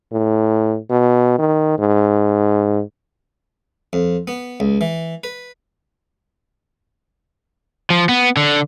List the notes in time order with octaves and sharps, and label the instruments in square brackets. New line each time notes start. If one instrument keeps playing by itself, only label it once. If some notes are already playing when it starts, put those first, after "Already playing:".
[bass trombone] A2
B2
D#3
G#2
[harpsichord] F2
B3
C#2
E3
B4
[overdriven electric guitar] F3
B3
D3